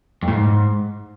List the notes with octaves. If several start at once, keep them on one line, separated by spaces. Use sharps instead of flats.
F2
A2
G#2